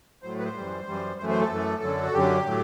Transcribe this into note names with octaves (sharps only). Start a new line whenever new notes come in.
A2 F#3 A3 C5
B4
C5
F#2 E3 G3
F#2 E3 G3
F#2 E3 A3 C5
C5
A4
F#2 E3 A3
F#2 D3 F#3
F#4
F#2 D3 F#3 G4
A2 F#3 A3